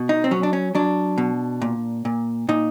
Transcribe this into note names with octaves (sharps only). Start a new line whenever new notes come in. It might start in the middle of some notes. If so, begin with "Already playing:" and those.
Already playing: B2
D#4
C4
F#3 C#4
D4
C#4
F#3 D4
B2
A#2
A#2
A#2 D#4